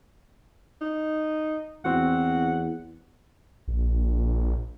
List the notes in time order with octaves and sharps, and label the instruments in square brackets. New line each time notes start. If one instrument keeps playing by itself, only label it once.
[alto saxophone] D#4
[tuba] E2 [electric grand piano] C4 F#4 [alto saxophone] F#5
[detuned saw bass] A#1